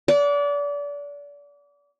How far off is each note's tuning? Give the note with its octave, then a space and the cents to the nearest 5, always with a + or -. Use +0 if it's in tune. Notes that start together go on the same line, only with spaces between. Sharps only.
D5 -30 F#5 -30